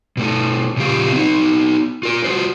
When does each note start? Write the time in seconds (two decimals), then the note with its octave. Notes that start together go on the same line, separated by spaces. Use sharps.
0.17 B2 A3
0.77 A#2 C#3 F3 G4 F5
1.12 B3 D#4
2.03 F4 A#4
2.24 F4 F#4 C5